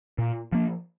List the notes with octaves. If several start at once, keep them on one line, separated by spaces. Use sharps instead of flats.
A#2
F3 A#3